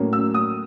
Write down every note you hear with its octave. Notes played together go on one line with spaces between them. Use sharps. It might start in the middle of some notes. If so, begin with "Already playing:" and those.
Already playing: A2 F#3 A#3 C#4
E6
D#6